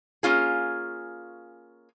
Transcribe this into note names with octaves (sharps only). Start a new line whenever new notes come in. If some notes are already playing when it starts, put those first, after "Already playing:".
A#3 C#4 F4 G#4